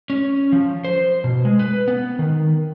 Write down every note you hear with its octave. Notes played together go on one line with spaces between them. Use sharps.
C#4
F3
C5
B2
G#3
B4
B3
D#3